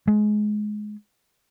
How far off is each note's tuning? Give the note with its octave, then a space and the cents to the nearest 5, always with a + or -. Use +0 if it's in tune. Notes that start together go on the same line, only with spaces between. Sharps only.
G#3 +20